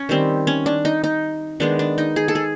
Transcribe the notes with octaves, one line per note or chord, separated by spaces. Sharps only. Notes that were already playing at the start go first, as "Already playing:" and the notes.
Already playing: C#4
D#3 G3 C4
C#4
D4
D#4
D#4
D#3 G#3 B3 D4
D4
D#4
G#4
A4
G#4